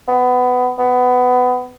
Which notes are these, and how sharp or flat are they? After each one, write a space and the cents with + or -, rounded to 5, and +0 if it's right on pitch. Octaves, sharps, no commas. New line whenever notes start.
B3 +20
B3 +20